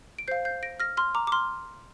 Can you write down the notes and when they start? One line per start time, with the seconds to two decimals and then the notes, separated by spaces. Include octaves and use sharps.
0.19 D7
0.28 C5 F5 G6 C7
0.45 G6 C7
0.63 A#6 D7
0.80 F6 A#6
0.97 C6 F6
1.15 A#5 D6
1.27 D6
1.32 C6 F6